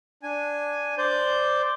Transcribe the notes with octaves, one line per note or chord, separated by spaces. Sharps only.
D4 G#5
C5 D5 G6